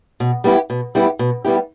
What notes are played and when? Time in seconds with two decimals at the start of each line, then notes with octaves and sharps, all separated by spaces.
0.20 B2
0.44 G3 B3 E4 G4
0.70 B2
0.95 G3 B3 E4 G4
1.19 B2
1.45 G3 B3 E4 G4